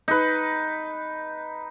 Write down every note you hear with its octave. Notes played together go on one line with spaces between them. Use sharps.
D#4 B4